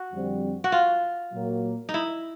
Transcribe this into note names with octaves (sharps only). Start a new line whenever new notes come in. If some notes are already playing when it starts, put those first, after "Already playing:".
Already playing: F#4
F2 D3 G3 C4
F#4
F4
A#2 F#3 A#3
D#4
E4